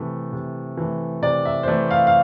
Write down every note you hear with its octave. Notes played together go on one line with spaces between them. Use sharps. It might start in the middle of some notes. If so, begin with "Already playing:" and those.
Already playing: C3 E3 A3
C3
E3 A3
C3 D5
E5
C5
E3 A3 D5
F5
F5